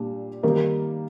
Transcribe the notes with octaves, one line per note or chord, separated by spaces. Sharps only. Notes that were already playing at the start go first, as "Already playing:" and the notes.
Already playing: A#2 G3 D4
D#3 G3 A#3 D#4 A#4